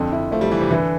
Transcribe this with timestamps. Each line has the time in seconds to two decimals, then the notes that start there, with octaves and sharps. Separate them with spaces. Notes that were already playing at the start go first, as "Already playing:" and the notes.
Already playing: F2 D3 C4
0.12 D3 E4
0.32 F3 A3
0.41 G3
0.51 E3 E4
0.61 C3
0.70 D3 E3